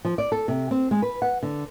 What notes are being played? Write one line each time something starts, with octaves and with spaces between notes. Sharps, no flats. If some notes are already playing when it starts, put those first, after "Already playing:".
F3
D5
A4
C3
C4
G#3
B4
F#5
D3